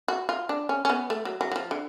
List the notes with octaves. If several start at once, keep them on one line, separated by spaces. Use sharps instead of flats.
F#4
F4
D4
C#4
C#4
B3
A3
F#3
F#3
F#3
F3
D3